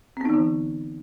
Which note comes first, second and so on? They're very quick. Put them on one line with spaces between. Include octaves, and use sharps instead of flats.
C4 B3 D#4 E3 D3